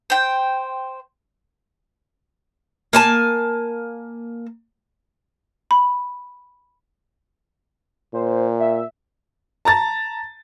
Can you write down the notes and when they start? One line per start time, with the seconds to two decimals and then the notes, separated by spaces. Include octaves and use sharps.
0.10 C5 G5
2.93 A#3 G#5 A5
5.71 B5
8.14 A#2 C5
8.59 E5
9.65 A5 A#5 A6